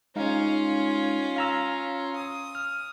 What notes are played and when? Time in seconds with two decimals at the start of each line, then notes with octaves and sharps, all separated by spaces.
0.16 G#3 C#4 D#4 F4 F5
1.36 F5 A#5 E6
2.15 D#6
2.55 F6